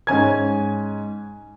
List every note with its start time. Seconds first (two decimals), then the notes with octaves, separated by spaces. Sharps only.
0.07 G#2 C#4 G#5 G#6